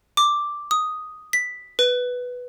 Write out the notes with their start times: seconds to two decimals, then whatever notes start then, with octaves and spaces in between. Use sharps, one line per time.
0.17 D6
0.71 D#6
1.33 B6
1.79 B4